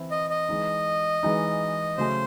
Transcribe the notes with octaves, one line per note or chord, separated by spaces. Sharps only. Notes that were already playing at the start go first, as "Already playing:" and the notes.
Already playing: E3 C4 E4
D#5
D#5
E3 G#3 D#4
E3 G#3 D#4
C#3 F#3 A3 C#4 C5